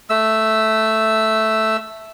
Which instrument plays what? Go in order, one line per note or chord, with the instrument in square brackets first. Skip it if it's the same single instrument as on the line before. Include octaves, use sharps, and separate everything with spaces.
[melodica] A3 E6